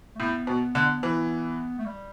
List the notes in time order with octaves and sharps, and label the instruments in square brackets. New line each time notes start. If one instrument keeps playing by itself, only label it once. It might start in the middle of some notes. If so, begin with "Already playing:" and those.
[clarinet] A3
[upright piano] A2 [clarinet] B3
[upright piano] B2
D3
E3
[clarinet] A3
G3